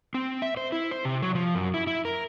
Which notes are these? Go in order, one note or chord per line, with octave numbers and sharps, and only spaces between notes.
C4
E5
C5
E4
C5
C3
F#3
F3
F#2
E4
E4
A#4